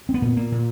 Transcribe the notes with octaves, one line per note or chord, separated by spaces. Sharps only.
C4
B3
A#2
A#3
A#2